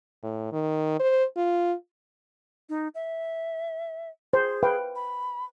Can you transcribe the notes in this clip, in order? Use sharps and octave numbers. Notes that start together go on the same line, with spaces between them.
A2
D#3
C5
F4
D#4
E5
G#4 C5
B4 F5 G5
B5